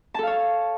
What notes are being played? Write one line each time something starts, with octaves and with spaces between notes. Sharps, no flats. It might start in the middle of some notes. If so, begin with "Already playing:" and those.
A4 C#5 F5 A5